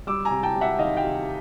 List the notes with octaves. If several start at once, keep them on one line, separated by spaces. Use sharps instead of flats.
G3 D6 E6
G#5 A#5
C3
G5 A5
C3
E5 F#5
D#3 D#5 F5
F5 G5
C3